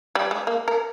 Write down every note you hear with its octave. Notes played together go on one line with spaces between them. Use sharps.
G3
G#3
A#3
A#4